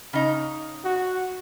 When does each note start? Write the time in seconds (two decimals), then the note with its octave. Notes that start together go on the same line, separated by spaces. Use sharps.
0.13 C#3 D#4
0.85 F#4